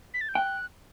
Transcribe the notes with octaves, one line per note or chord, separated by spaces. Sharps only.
B6
A6
G6
G5 F#6